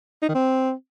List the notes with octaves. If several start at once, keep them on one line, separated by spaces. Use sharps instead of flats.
D#4
D#3
C4